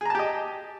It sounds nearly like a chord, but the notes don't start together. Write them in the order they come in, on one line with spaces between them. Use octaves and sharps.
G#4 A#5 A5 G4 D#5